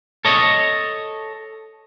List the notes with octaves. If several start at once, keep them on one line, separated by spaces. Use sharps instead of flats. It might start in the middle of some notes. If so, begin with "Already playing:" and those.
A4 C#5 D#5